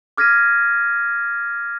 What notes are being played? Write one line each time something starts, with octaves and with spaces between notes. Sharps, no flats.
D6 F6 G#6 A#6 B6 D#7